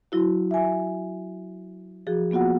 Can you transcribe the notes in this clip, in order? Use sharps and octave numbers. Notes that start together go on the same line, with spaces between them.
F#3 E4 F#4
E5 G#5
F3 F#4 G#4
A#3 B3 F4 F#4 F#5